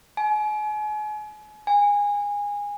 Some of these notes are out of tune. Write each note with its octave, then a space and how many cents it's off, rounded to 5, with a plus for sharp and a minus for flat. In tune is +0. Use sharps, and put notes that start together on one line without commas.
G#5 +35
G#5 -20